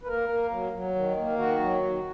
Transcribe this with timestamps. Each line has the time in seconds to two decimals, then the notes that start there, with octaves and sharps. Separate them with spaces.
0.03 B4
0.07 A#3 A#4
0.29 A#3
0.50 F#3
0.73 F#3
0.95 D#3
1.17 A#3
1.38 D#3 F#4
1.60 F#3
1.82 D#3